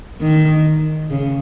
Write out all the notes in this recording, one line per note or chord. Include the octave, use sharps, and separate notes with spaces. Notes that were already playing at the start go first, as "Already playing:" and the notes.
D#3
C#3